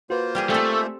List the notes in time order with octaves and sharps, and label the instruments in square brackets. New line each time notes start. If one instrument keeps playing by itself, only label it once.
[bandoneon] A#3 F4 C5 [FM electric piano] F#4 B4
[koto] G3 G4 G#4
[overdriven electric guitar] A3 [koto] C4 A4 [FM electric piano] D5 G#5 E6